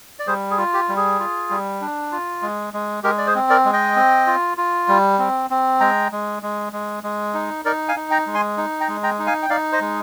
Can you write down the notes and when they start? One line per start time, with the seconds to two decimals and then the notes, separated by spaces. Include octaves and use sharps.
0.19 D5
0.27 G3 G#4 C5
0.51 G#4
0.58 F4
0.74 G4
0.89 G3
0.97 G#4
1.20 F4
1.50 G3
1.81 D4
2.12 F4
2.42 G#3
2.74 G#3
3.03 G#3 G4 A#4
3.18 D5
3.27 G#4 C5
3.35 C4
3.50 A#4 D5
3.65 G#3
3.73 D#5 G5
3.96 C4
4.27 F4
4.58 F4
4.88 G3
5.19 C4
5.50 C4
5.80 G#3 G5 A#5
6.12 G#3
6.43 G#3
6.73 G#3
7.03 G#3
7.34 D#4
7.65 D#4 A#4 D5
7.88 F5 G#5
7.96 D#4
8.11 G5 A#5
8.26 G#3
8.34 G#5 C6
8.57 D#4
8.80 G5 A#5
8.88 G#3
9.03 G5 A#5
9.19 D#4
9.27 F5 G#5
9.43 G5
9.50 D#4 D5 F5
9.72 C5 D#5
9.80 G#3